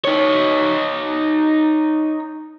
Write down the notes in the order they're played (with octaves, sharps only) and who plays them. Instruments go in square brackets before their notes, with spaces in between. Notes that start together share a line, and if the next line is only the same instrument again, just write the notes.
[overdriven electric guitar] D#4 C#5